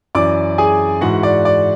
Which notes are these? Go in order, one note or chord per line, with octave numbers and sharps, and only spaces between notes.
F#2 E3 D5 D6
G#4 G#5
G#2 E3 F#4 F#5
D5
D5